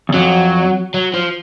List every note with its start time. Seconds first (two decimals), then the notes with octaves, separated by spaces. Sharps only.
0.09 E2
0.14 F2 F#3
0.94 F#3
1.14 F3